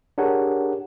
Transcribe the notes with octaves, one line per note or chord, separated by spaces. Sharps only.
D4 G4 G#4 A#4 C#5 F#5